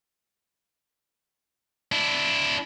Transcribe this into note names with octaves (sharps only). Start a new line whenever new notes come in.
D4 E4